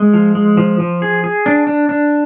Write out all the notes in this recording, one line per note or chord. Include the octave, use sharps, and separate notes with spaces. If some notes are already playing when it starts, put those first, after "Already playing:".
Already playing: G#3
F3
G#3
F3
F3
G#4
G#4
D4
D4
D4